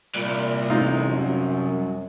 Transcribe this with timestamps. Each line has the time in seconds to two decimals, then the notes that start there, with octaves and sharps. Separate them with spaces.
0.15 C2 A#2
0.70 A1 C3 D#4 F4
1.10 F#2